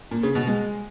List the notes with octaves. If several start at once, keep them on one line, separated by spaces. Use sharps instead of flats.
A#2
C#3
B2
G#3